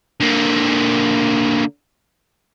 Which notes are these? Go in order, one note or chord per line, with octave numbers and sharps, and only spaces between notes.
D3 A#3